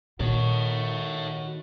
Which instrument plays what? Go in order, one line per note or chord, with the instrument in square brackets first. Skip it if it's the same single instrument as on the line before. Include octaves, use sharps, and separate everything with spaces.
[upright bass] A#2 [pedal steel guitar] D#3 [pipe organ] F#4 [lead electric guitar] A4 C#5